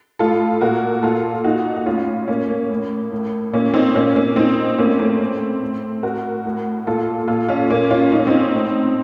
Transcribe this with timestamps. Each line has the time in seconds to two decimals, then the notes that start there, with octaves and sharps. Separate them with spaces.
0.19 A2 F4 A4
0.61 A#2 F#4 A#4
1.03 A#2 F4 A4
1.44 A#2 D#4 F#4
1.76 F#4
1.86 A2 C#4 F4
2.28 A#2 A#3 C#4
2.49 A#3
2.69 A2
3.12 A2
3.53 A#2 A#3 C#4
3.74 C4 D#4
3.95 A#2 A#3 C#4
4.15 A#3 C#4
4.36 A#2 C4 D#4
4.78 A2 A#3 C#4
4.99 A3 C4
5.20 A2
5.62 A2
6.03 A2 F#4 A#4
6.45 A2
6.87 A#2 F4 A4
7.28 A#2 F4 A4
7.49 C#4 F4
7.70 A#2 A#3 C#4
7.91 C#4 F4
8.12 A#2 D#4
8.19 C#4
8.27 C4 D#4
8.54 A2